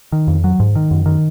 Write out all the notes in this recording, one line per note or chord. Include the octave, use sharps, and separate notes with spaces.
D#3
F2
F#3
G#2
D#3
F#2
D#3